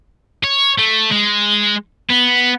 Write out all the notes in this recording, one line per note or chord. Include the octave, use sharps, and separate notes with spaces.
C#5
A3
G#3
B3